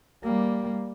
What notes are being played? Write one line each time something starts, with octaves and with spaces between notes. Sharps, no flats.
G3 A#3